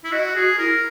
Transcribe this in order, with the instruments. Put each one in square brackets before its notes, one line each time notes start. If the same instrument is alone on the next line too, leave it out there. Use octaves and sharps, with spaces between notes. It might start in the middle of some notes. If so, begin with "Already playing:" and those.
[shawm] E4
[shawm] F#4 [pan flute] D#5
[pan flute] F#4 [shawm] G#4
[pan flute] E4 [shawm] A#4